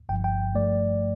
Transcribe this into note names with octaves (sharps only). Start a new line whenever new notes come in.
G1 G2 F3 G5
G5
G2 F3 A3 D5